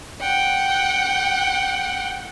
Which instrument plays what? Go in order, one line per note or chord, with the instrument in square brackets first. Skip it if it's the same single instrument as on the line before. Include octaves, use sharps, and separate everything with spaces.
[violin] F#5 G5